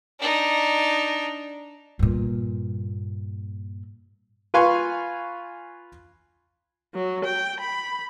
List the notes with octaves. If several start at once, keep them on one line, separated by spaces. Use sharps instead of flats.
D4 D#4
G2 A#2
F4 B4 F5 G#5 C6 C#6
F#3
G5
B5